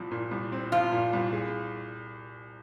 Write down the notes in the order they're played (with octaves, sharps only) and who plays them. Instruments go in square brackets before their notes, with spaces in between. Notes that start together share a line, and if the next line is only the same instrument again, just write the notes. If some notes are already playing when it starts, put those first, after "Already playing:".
Already playing: [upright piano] C2 A#2 F3 C4
A#2
C2
C4
[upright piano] F3 [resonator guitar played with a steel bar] F4
[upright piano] A#2
C2
G#4